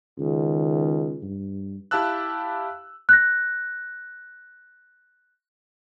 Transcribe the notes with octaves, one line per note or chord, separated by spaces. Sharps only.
C#2 D#3
G2
E4 G4 F5 A5 E6 F#6
F#6 A#6